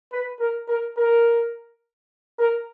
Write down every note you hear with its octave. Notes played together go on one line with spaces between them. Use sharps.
B4
A#4
A#4
A#4
A#4